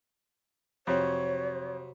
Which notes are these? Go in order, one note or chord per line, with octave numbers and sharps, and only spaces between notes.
F2 C3 F#3 C#5